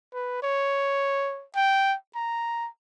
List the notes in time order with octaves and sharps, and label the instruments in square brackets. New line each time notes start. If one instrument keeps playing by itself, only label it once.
[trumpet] B4
C#5
G5
A#5